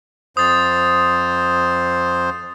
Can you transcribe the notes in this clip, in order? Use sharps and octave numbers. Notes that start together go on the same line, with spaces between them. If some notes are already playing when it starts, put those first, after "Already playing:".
F2 C5 D#6 A6